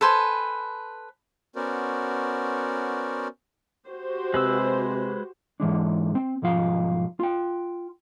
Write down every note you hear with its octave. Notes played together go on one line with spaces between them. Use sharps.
A4 B4 C5 G#5
B3 C#4 F#4 A#4 C5 D5
F#4 G4 C5
C3 G#3 B4 E6
G#2 E3 G#3 D4
C4
B1 G#2 F3 F4 F5
F4 G5